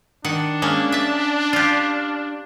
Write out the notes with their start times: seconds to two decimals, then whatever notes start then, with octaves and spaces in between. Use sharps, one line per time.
0.24 D#3 D4 F#5
0.62 G#3 A#3 C#4
0.92 E5 A5
1.53 F4 G4